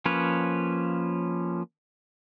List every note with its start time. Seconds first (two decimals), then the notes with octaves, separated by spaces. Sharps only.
0.05 F3 A#3 C#4 B4 C#5